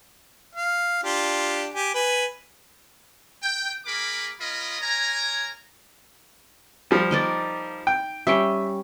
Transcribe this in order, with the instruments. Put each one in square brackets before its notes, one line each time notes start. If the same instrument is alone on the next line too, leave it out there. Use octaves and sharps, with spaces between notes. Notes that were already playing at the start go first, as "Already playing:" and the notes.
[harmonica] F5
D4 F4 G4
G4 G#5
B4 G#5
[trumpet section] G5
A#3 G#4 A#4 B5 D6
C#4 F4 A#4 D#5 B5
A#4 C#5 G#5 A#5
[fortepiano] F3 G3
[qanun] D#4 A#4 D5
[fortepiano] G5
[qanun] G3 C#4 G5 [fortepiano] E5